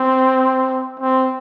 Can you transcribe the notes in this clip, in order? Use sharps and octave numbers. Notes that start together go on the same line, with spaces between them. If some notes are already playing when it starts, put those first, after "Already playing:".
Already playing: C4
C4